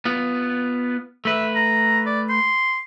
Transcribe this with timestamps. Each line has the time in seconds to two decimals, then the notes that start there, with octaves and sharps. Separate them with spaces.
0.05 B3 F4
1.25 A3 B4 E5
1.55 A#5
2.06 D5
2.29 C6